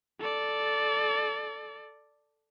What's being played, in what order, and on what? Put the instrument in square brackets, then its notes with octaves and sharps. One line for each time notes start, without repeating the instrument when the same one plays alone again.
[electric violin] A4 D5